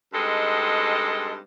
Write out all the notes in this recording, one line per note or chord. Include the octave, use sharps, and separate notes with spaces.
G2 G#3 C4 D#4 A4 D#5